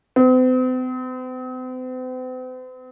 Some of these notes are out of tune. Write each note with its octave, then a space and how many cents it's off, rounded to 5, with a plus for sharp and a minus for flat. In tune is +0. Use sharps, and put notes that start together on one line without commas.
C4 -45